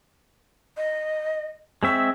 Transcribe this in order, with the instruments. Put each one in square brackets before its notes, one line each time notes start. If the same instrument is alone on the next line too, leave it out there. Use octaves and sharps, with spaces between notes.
[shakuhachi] D#5
[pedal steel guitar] G#3 C4 E5 [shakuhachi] C#6